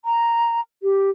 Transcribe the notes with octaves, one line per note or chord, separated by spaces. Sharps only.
A#5
G4